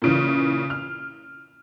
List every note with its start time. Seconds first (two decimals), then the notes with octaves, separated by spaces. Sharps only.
0.02 A#2 C#3 E3
0.70 F6